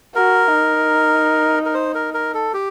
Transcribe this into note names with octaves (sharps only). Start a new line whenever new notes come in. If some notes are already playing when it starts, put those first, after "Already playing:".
F#4 A#4
D#4
A#4
C5
A#4
A#4
A4
G4